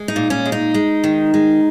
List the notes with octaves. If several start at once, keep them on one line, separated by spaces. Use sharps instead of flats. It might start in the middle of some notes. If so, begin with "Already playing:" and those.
Already playing: G#3
D#4
A#2
C#4
G#3
D#4
G#3
D#3
G#3